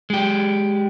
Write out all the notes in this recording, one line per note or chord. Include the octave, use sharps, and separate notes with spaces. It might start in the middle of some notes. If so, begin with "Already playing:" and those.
G#3 G4